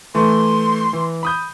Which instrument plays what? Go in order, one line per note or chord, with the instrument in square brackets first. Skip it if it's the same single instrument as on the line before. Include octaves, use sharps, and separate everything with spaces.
[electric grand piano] E3 A3 [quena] C6
[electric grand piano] E3
B5 D#6 G6